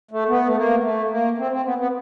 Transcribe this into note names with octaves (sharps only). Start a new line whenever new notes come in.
A3
B3
A3
A#3
A3
A#3
C4
C4
B3
B3